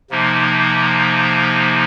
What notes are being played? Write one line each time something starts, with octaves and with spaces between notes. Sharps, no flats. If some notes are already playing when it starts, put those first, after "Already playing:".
C3 F3 A#3 D#4